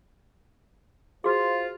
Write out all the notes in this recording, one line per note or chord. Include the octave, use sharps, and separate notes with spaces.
F4 F#4 G#4 C5